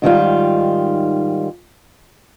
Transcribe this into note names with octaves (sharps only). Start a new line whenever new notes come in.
G#2 D#3 G3 F4